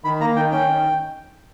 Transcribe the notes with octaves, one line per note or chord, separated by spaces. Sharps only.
D#3 B5
A#3 A#5
D#3 G5
C#4 G5
D#3